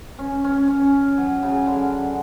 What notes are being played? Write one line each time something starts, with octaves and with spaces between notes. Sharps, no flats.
C#4
C#4
C#4
F#3
C#3
D3